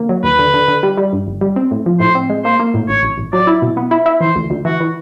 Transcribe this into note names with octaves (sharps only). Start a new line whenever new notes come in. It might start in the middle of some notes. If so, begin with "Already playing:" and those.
Already playing: D3 A#3
F#3
D#2 B4
D3
D3
D3
G3
G3
G2
G1
G3
C4
A2
F3
A2 C5
C4
G#3
A#3 C5
A#3
A2
A1 C#5
A1
A1
F#3 D5
E4
B2
B3
E4
E4
E3 C5
D2
D2
E3 F#4
E3